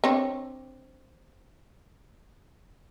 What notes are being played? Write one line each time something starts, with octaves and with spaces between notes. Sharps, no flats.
C4 D4 C#5